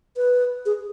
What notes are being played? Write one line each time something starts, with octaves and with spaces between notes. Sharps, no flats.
B4
G#4